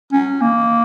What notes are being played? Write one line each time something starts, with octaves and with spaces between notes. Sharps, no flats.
C#4
A#3